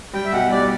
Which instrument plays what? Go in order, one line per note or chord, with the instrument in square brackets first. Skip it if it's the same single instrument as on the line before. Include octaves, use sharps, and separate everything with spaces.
[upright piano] G3 [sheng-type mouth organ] G5
[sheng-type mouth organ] E5
[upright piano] B1 [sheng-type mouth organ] F#5
[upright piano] G3 [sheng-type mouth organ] D5